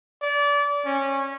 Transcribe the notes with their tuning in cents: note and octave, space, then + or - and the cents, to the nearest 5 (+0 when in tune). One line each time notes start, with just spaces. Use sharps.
D5 -30
C#4 -20